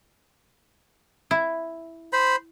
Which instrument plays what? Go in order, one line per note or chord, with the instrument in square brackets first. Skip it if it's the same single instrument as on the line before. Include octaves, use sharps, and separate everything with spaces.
[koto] E4
[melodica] C5 B5